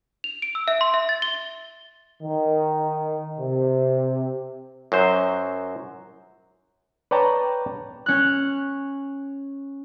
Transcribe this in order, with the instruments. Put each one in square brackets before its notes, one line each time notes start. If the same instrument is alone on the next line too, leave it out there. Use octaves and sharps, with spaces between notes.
[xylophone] F7
D7
E6
E5
C6
E5
A6
G7
[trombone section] D#3
C3
[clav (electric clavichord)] F#2 F#3 C5
B4 C#5 D5 G5 A5 A#5
[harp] C#4 F#6